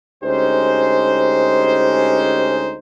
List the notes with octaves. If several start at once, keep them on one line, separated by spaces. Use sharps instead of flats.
D2 G#3 C#4 D#4 G4 C5